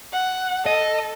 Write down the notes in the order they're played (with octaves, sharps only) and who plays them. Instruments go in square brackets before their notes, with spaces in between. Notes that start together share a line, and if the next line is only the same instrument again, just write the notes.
[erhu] F#5
[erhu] A4 [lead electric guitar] D#5